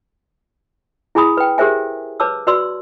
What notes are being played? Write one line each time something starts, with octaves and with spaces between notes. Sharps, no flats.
E4 G#4 G#5 B5 D#6
B4 G5
G4 G#4 A#4 C5 E5 G#5
B4 C#5 A5 D6 E6
F#4 B4 D5 C6 E6